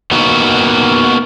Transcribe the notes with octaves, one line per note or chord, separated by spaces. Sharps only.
A#3 B3 D#4 F#4